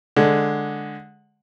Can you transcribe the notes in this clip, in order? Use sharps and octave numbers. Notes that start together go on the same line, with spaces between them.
D3 G#3